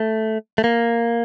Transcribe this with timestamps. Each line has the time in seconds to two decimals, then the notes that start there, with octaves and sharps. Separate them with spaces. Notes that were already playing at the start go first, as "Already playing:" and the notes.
Already playing: A3
0.58 A3
0.64 A#3